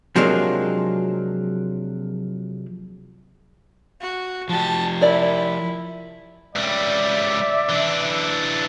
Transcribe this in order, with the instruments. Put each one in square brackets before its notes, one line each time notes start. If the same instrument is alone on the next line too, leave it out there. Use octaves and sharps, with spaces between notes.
[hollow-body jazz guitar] C3 F3 F#3 G#3 A#3 D4
[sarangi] F#4
[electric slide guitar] F3 G4 [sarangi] A5
[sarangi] E4 [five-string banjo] A#4 D5
[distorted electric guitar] C#2 G3 [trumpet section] D5 E5
[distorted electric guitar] E3 D4